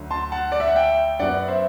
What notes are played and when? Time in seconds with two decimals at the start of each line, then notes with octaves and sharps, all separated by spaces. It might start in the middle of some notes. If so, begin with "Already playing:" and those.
Already playing: D2 D3 F#3
0.11 A5 C6
0.32 F#5 A5
0.52 D5
0.60 E5
0.68 F#5
0.76 E5 G5
1.19 F#2 F#3 B3 D5 F#5
1.48 C5 E5